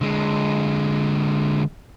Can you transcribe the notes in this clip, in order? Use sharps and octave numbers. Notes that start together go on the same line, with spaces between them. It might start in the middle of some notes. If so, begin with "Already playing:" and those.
D3 G#3